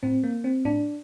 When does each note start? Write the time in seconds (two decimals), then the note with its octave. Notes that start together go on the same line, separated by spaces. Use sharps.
0.03 A2 C4
0.23 A#3
0.44 C4
0.65 A2 D4